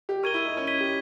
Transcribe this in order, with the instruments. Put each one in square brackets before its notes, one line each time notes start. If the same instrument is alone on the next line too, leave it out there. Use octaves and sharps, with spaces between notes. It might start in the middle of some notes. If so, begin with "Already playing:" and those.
[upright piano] G4
[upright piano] A#4 [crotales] C#6 G#6 D#7 G7
[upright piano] E4
D#4
C#4
[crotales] G#6 B6 D#7 G7
[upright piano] G4